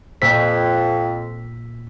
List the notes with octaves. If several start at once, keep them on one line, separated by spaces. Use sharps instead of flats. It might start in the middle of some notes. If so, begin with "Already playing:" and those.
F2 A#2 E6 B6